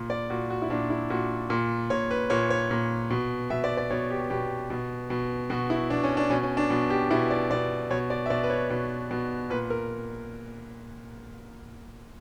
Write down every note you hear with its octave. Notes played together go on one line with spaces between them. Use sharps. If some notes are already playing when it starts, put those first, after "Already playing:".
Already playing: A#2
D5
A#2 F#4
F#4
E4
A#2 D4
E4
A#2 F#4
A#2
A#2 C#5
B4
A#2 C#5
C#5
A#2
B2
B2 E5
D5
D5
B2 C#5
G4
B2 G4
B2
B2
B2 F#4
E4
B2 D4
C#4
D4
B2 C#4
C#4
D4
B2
G4
B2 E4
D5
B2 D5
B2 C#5
D5
E5
B2 D5
B4
C#5
B2
B2
A#2 B4
A#4